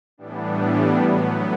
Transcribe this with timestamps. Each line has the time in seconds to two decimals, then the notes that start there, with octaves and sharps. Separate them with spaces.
0.18 A2 E3 G3 B3 D4
0.99 A2 F#3 B3